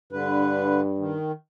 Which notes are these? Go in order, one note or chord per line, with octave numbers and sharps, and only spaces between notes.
G2 D3 B4
D#3